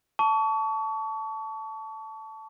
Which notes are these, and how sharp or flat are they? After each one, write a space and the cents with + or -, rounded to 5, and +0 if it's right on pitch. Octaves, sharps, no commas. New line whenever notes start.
A5 +0 C#6 +35